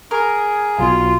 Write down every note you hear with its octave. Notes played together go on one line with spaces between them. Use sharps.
G#4 A#4
B1 B2 F4